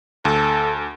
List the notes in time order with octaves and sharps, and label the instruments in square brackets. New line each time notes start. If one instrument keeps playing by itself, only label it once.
[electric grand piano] D2 [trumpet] A4